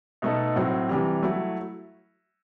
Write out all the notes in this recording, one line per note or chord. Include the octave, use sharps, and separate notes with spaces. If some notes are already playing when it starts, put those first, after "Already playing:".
B2 A3 D#4 A4
A2 F#3 C4
C3 E3 G3
F#3 A3 E4